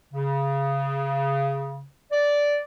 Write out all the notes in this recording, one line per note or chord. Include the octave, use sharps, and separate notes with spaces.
C#3
D5